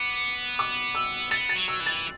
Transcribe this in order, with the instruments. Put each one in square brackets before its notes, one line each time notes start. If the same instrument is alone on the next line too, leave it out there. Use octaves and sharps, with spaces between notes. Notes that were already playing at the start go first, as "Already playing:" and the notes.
Already playing: [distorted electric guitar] B3 [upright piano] D6
[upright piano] D6
E6
[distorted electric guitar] B3 [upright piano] A6
[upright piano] A6
[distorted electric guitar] F#3
[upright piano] E6
[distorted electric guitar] E3
[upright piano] A6